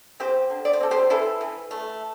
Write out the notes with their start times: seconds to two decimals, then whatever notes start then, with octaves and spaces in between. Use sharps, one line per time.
0.20 C4 G4 C5
0.50 D3
0.65 D5
0.73 C5
0.81 C4 A4
0.91 G4 C5
1.10 E3 E4 A4
1.41 E3
1.71 A3